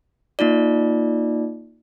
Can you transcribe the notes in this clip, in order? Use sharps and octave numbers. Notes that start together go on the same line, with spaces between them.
A#3 D#4 F4 D5